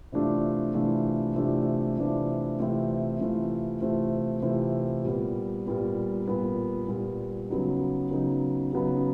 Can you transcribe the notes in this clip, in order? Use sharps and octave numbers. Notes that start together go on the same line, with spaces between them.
C3 E3 A3 D4 F4
C3 E3 A3 D4 F4
C3 E3 A3 D4 F4
C3 E3 A3 D4 F4
C3 E3 A3 C4 F4
C3 E3 A3 C4 F4
C3 E3 A3 C4 F4
C3 E3 A3 C4 F4
A#2 G3 B3
A#2 G3 B3
A#2 G3 B3
A#2 G3 B3
C#3 F#3 B3 D#4
C#3 F#3 B3 D#4
C#3 F#3 B3 D#4